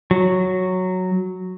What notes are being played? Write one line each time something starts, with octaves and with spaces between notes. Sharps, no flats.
F#3